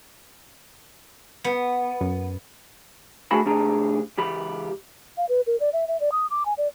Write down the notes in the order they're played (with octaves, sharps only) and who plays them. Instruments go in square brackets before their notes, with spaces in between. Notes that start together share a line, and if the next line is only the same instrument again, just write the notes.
[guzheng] B3
[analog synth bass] F#2
[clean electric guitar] D3 A3 F#4 G#4 A5 B5
A2 C3 D4 G4 G#4 A#5
C#2 E3 G4 B5
[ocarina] F5
B4
A#4
D5
E5
E5
D5
D#6
D6
G#5
D5